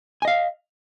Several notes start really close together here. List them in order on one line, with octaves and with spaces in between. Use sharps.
G#5 D#5 F5